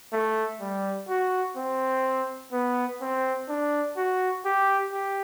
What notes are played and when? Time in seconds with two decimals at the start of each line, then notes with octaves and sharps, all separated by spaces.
0.13 A3
0.61 G3
1.09 F#4
1.57 C4
2.52 B3
3.01 C4
3.49 D4
3.97 F#4
4.45 G4
4.93 G4